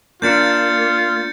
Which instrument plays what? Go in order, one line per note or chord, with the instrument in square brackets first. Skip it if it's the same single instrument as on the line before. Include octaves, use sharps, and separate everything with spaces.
[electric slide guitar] A#3 D4 [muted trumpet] F4 [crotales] G6 A6 C#7